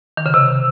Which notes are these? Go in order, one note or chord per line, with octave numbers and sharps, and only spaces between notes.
D#3
C#3
C3